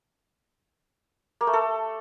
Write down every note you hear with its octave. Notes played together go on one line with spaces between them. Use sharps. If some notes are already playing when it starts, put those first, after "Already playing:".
A#3
A3
A4